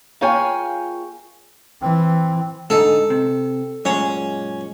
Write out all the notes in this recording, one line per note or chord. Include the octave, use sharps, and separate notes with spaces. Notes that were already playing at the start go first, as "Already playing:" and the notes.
A#3 F4 G#4 C#5 G5 G#5
E3 C4
G#2 D3 D#4 A4
C3
F#2 A#2 G#3 C#4